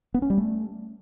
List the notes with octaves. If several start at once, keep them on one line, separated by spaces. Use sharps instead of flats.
B3
C#4
G3
A3